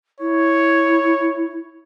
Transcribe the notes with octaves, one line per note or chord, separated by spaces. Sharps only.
E4 C#5